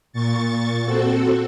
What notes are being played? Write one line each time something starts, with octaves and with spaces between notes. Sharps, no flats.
A#2 C#6 A6
C4 F#4 A4